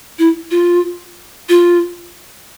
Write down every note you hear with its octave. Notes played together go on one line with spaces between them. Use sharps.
E4
F4
F4